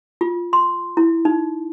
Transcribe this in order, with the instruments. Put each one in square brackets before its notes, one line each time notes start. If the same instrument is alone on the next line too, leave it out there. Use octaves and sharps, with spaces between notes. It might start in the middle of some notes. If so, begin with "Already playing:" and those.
[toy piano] F4
C6
E4
D#4